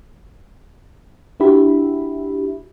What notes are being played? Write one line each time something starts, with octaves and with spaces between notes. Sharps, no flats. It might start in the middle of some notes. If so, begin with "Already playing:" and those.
D4 E4 F#4 G4 E5 B5